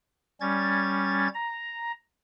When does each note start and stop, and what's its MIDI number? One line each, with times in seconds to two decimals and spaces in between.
0.41 1.28 55
0.41 1.28 61
0.41 1.28 92
0.41 1.28 93
1.34 1.91 82